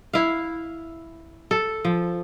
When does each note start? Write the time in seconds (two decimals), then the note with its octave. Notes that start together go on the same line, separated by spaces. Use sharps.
0.13 E4 F5
1.51 A4
1.85 F3